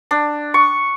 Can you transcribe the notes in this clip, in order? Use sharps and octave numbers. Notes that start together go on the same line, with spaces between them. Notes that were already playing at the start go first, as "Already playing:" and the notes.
D4
C#6